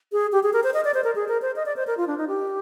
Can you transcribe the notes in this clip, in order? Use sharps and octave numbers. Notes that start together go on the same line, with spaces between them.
G#4
G4
G#4
A#4
C5
D#5
D5
C5
A#4
G#4
A#4
C5
D#5
D5
C5
A#4
F4
D4
D#4
G4